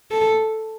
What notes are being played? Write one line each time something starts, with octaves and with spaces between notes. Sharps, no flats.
A4